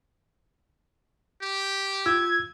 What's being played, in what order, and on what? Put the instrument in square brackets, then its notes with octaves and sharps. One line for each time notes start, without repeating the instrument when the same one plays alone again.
[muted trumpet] G4
[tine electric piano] F4 E6 [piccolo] G#6